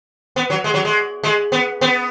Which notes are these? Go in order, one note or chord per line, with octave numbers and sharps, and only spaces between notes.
B3
F#3
G#3
F#3
G#3
G#3
B3
B3